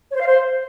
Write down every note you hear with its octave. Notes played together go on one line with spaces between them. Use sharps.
C#5
C5
F5
C5